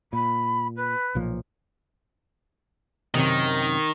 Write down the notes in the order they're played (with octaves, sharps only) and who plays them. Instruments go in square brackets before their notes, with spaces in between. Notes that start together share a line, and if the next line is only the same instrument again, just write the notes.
[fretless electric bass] A#2 [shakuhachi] B5
[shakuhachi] B4
[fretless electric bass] B1 A#2 F3
[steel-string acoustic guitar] F#2 C3 [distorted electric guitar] D#3